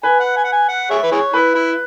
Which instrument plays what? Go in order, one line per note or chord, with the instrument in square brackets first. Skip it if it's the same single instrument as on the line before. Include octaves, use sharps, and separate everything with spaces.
[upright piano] B4 [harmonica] G#5
[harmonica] F#5
G#5
F#5
G#5
F#5
G#4 C#5 E5
B4
E4 G#4 C#5
[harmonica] E4 [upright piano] B4
[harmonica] E4